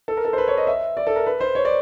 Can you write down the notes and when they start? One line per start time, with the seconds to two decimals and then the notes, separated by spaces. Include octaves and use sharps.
0.08 A4
0.17 A#4
0.25 A4
0.33 C5
0.38 B4
0.48 C#5
0.57 D#5
0.67 E5
0.97 D5
1.07 A4
1.16 A#4
1.26 B4
1.40 C5
1.55 C#5
1.65 D5